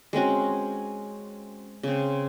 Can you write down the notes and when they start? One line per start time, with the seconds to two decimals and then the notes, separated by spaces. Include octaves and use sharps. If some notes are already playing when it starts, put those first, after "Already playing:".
0.13 G#3 C4 C#4 F#4
1.83 C#3 C4